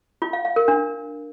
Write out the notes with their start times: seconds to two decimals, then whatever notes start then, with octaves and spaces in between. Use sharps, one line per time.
0.22 F4
0.33 F5
0.45 F5
0.56 A#4
0.68 D4